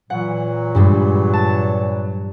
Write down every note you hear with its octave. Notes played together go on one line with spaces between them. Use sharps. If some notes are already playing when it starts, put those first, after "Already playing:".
A#2 E3 F#3 F#5
G2 G3 G#3
A5